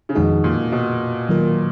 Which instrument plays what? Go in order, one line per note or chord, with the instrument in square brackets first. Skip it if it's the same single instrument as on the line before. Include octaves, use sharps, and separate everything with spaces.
[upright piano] C#3
[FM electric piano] F2 D#3 G#3 D#4 G#4 [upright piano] B2
[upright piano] A#2
B2
[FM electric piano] D#3 F#3 A#3 F4 A#4